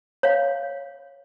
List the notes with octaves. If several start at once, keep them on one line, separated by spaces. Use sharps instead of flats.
C#5 F5